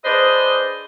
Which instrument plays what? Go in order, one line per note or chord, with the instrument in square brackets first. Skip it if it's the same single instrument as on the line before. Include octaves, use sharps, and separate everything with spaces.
[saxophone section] D4 G#4 B4 C5 D#5